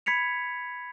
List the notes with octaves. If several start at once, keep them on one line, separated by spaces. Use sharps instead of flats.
B5 G#6 B6 C#7 F7